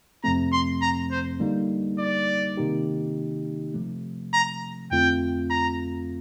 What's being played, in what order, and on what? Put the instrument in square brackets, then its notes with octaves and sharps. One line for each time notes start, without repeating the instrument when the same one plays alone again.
[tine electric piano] F2 C3 F3 A3 C4 [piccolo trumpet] A#5
[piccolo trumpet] C6
A#5
C5
[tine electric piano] D3 G3 A#3 D#4
[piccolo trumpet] D5
[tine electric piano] C3 D#3 A#3 D#4 G4
C3 F3 A3
[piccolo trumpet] A#5
[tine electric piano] F2 D3 A3 C4 F4 [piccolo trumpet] G5
[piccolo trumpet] A#5